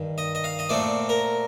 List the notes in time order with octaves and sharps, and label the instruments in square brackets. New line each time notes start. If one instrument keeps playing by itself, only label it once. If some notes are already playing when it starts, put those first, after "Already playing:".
Already playing: [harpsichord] G2 D#3
D#5
D#5
F5
D#5
A#2 A3 C4 D5
A#4